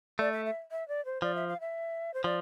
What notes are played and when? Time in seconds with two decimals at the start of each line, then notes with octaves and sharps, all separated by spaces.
0.19 A3 D5
0.33 E5
0.45 E5
0.71 E5
0.88 D5
1.05 C5
1.22 F3 D5
1.35 E5
1.48 F5
1.60 E5
2.14 C5
2.24 F3 D5